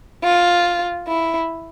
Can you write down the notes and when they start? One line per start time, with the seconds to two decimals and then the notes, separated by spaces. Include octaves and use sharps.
0.24 F4
1.08 E4